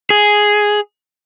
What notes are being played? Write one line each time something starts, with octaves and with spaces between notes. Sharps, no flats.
G#4